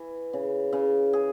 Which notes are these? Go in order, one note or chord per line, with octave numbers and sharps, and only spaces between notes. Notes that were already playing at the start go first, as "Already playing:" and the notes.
Already playing: E3
C#3
C#3
G#4